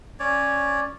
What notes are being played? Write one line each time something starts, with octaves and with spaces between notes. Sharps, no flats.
C#4 C#5 D5